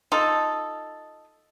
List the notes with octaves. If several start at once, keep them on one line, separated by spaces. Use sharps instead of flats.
D#4 F4 A4